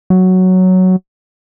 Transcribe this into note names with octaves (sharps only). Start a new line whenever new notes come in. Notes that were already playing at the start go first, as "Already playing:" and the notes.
F#3